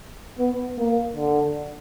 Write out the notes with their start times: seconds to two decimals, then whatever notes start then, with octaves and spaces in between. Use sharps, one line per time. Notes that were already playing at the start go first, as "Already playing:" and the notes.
0.39 B3
0.78 A#3
1.16 D3